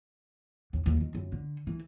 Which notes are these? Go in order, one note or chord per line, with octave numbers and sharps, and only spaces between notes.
D#2
D#2
D#3
F#2
D3
E3